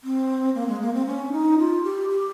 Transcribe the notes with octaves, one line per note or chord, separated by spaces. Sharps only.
C4
A#3
G#3
A#3
C4
C#4
D#4
F4
G4
G4